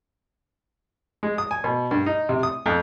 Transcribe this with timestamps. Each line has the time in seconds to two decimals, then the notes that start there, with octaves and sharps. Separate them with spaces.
1.23 G#3
1.38 D#6
1.51 G#5
1.64 B2
1.91 G2
2.06 D#4
2.29 C3
2.43 D#6
2.66 F2